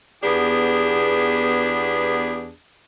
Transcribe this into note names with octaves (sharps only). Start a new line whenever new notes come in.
E2 B3 D4 G4 G#4